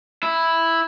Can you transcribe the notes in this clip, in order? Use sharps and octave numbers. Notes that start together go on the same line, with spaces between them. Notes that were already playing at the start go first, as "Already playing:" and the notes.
E4